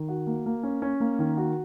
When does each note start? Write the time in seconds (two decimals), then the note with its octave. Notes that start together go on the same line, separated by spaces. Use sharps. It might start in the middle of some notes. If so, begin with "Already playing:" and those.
Already playing: D#3
0.09 F#4
0.27 A#3
0.46 A#3
0.63 C#4
0.82 C#4
1.00 A#3
1.19 D#3
1.37 F#4